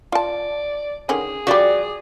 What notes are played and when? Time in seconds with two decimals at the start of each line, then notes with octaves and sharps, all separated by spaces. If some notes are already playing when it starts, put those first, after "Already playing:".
0.12 F4 D5 A5
1.09 D3 D#3 C#4 G#4
1.47 F3 G3 F#4 G4 D5